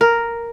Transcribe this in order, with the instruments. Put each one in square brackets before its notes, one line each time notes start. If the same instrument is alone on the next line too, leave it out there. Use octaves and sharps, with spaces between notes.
[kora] A#4